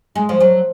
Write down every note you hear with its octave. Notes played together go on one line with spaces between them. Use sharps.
G#3
F3
F#3